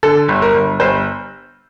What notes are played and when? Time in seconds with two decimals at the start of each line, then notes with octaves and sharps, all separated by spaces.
0.03 D3 A4
0.28 G1
0.42 A#4
0.54 G1
0.80 G1 C5